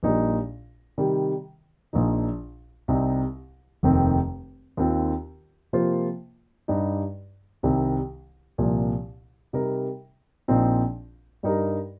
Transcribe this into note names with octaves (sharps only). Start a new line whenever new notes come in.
A#1 A#2 G3 D#4
C3 D#3 G3
A#1 A#2 F3 D#4
C2 C3 G3 C4 D#4
F1 D#2 D#3 C4
D#2 D#3 C4 F4
C3 F3 A#3 F4 C5
G2 G3 D#4
C2 C3 D#3 G3 C4
C2 A#2 F3
C3 G3 D#4 A#4
A#1 A#2 F3 C4 D#4
G2 G3 D#4 A#4